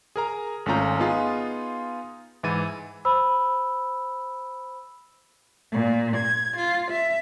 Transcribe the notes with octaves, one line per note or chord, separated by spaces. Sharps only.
G#4 A#4 A#5
G#1 A3 C#4 F4 A#5 G6
B3 D#4 F4 G#4
G#2 E3 E4 A6 D#7
C5 B5 E6
A#2
G#6
F4
E5